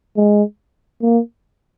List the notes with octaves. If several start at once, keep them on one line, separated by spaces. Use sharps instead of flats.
G#3
A#3